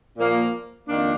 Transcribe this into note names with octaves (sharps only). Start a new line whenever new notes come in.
A#2 F3 A#3
F2 D#3 A#3 D4